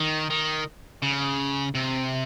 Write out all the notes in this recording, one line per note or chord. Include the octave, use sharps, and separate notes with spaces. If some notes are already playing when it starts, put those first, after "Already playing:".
Already playing: D#3
D#3
C#3
C3